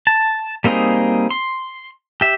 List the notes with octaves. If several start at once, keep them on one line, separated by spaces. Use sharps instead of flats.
A5
G3 A#3 C4 D#4 G#4
C6
G4 E5